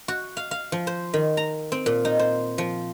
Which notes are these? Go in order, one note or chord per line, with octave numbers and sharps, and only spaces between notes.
F#4
F5
F5
F3
C5
D#3
A#5
C4
A#2
D#4
C5
F3